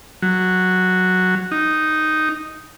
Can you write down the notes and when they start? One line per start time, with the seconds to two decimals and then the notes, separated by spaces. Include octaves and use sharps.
0.22 F#3
1.52 D#4